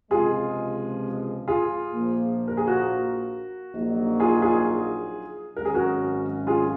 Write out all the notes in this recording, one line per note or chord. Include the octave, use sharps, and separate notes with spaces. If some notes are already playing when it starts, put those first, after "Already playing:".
C#2 C3 F3 G#3 F4 G#4
F4 G#4
A#1 A#2 F3 A#3
A#4
G#4
F#4 A#4
A#1 A#2 F#3 A#3 D#4
F4 G#4
F4 G#4
G#1 G#2 F#3 C#4 A#4
G#4
F#4 A#4
F4 G#4